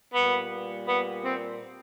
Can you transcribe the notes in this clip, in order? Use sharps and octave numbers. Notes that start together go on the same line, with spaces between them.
A#2 G3 A#3 B3
B3
C4